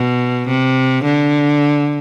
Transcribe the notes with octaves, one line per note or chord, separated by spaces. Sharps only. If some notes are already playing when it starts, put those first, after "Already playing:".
Already playing: B2
C3
D3